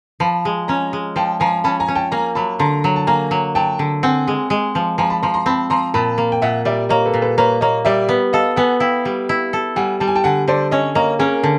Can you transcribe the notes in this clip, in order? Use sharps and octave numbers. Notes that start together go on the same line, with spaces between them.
F3 A5 B5
G#3
C#4 G#5 A#5
G#3
F3 G5 A5
F3 G#5 A#5
C#4 A5 B5
G#5 A#5
C#4
G5 A5
A#3 G#5 A#5
F#3 A5 B5
D3 A#5 C6
F#3
A5
A#3 G#5 A#5
F#3
F#3 G5 A5
D3
C4 F#5 G#5
G#3
G#3
F3
F3 G#5 A#5
A5 B5
F3 A#5 C6
A#5 C6
C4 A5 B5
F3 A#5 C6
A#2 A5 B5
A#3
G5
A#2 E5 F#5
G3 D5 E5
A#3 C#5 D#5
A4 B4
A#2
A4 B4
A#3 B4 C#5
A#3 C#5 D#5
G3 D5 E5
B3
A4 D#5 F5
B3 F#5 G#5
E4 F5 G5
G3
E4
A4
G3 F#5 G#5
G3 A5
G#5
G5 A5
D3 F#5 G#5
D3 C5 D5
C#4 C#5 D#5
A#3 C#5 D#5
C#4 G#4 A#4
D3